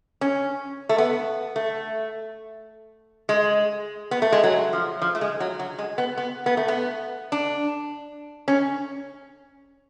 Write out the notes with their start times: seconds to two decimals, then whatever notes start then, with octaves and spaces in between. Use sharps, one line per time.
0.21 C#4
0.89 A3
0.98 B3
1.56 A3
3.29 G#3
4.11 B3
4.22 A3
4.32 G#3
4.44 F#3
4.73 F3
5.01 F3
5.15 A3
5.21 G#3
5.40 F#3
5.59 F#3
5.78 G#3
5.98 B3
6.17 B3
6.46 B3
6.57 A3
6.68 B3
7.32 D4
8.48 C#4